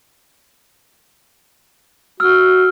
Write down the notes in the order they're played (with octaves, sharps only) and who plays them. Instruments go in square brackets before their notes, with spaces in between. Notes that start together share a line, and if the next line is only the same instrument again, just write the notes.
[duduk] F#4 [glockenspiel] E6 F6